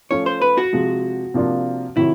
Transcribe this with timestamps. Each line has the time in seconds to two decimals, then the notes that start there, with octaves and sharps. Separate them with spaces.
0.11 F3 A3 C#4 C#5
0.26 C5
0.42 B4
0.58 F#4
0.73 C3 F3 G#3
1.34 C3 F3 A#3 D4 F4
1.97 C3 D#3 F#3 E4